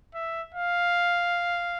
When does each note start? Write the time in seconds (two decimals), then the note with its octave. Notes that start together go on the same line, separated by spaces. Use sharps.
0.15 E5
0.55 F5